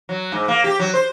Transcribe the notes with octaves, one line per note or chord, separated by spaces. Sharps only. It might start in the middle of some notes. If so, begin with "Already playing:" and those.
F#3
G#2
A#3
G4
F#3
C5